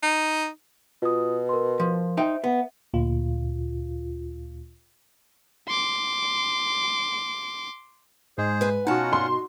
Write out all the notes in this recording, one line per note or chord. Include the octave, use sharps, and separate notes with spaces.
D#4
B2 F4 D#6
A#4 C6
F3
D#4 C5 E5 G5
B3
D2 A#2 F4
C6 D6
G#2 G#3 G#4 C5
B4 G#5
B2 C#4 D#4 F4 F#4 F#5 A5
C6